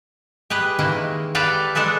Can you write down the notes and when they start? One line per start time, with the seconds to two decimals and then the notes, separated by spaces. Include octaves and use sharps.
0.50 G4 G#4 B4
0.79 D#3 E3 G#3 A#3
1.35 G4 A4 B4 D5 F5 G5
1.75 G#3 D4 G#4 A4 B4